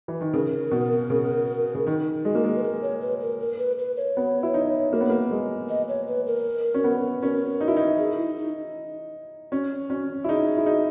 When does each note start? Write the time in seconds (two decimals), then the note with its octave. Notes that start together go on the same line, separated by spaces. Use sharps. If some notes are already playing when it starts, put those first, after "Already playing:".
0.08 E3
0.21 D#3
0.33 C#3 A#4
0.71 B2
1.10 C#3
1.75 C#3
1.87 D#3
2.25 G#3
2.35 A#3
2.44 G#3
2.56 B4
2.63 A#4
2.82 C#5
3.01 B4
3.21 A#4
3.40 A#4
3.59 B4
3.78 B4
3.97 C#5
4.17 B3
4.43 E4
4.54 D#4
4.93 A#3
5.01 B3
5.10 A#3
5.31 G#3
5.69 D#5
5.88 C#5
6.08 B4
6.27 A#4
6.74 C#4
6.84 B3
7.22 C#4 A#4
7.60 D#4
7.68 E4
7.76 D#4
7.98 G#4
8.17 E4
8.37 D#4
9.52 C#4
9.90 C#4
10.24 E4
10.29 D#4 G#4
10.57 E4
10.66 D#4